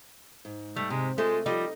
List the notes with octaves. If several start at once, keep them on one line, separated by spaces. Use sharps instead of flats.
G#2
G3 A3
C3 G#3
G#3 A3 F4 A4 D#5
F3 G3 D#4 F4 G4